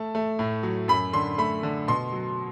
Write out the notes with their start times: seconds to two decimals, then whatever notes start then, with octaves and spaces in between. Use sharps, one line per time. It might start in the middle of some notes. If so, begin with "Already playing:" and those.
Already playing: A3 A5
0.15 A3
0.39 A2
0.63 F#3
0.88 F#2 B5
1.13 D3 C6
1.38 A3 B5
1.63 D3
1.88 B2 C6
2.13 F#3